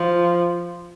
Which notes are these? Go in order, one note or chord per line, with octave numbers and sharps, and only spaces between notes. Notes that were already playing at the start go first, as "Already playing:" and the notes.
Already playing: F3